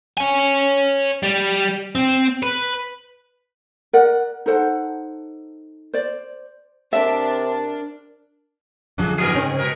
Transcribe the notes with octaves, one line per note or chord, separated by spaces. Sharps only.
C#5 G#5
G3
C4
B4
A#4 D5 F#5
D#4 A4 C5 F#5
C5 D5
C3 D4 A#4 E5
F#2 D3 F3 G3 G#4
G#2 D#3 F#3 B3 G#4 A#4
C#3 C4
B2 A#4